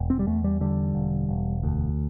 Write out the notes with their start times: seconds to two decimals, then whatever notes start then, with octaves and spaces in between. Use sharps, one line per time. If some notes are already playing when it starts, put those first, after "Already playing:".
Already playing: E1
0.10 C4
0.19 G3
0.27 E2 A3
0.44 G3
0.61 D3 G3
0.95 E1
1.29 E1
1.63 D2